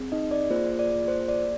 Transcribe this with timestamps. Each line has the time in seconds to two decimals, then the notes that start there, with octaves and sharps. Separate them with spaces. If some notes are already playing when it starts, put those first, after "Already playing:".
Already playing: C4 G#4
0.12 D#4 D#5
0.31 D5
0.50 A#3 F4 G#4 C5
0.79 D5
1.08 C5
1.28 D5